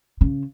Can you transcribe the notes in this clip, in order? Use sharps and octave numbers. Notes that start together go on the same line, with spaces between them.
C#3